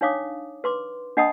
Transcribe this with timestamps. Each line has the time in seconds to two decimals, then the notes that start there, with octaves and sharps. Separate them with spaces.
0.01 D4 D#4 C#5 F5 D6 D#6
0.64 B4 C6 D6
1.17 D4 D#5 F#5 A5 B5 D#6